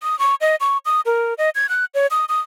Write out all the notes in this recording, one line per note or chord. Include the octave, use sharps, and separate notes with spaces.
D#6
C#6
D#5
C#6
D#6
A#4
D#5
G#6
F#6
C#5
D#6
D#6